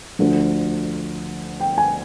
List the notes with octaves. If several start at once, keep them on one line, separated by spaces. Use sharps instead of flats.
D2 D3 F3
G5
G#5